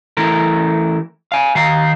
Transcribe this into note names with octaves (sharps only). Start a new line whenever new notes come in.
E3 A3 A#4
F5 G#5
D#3 F5 A#5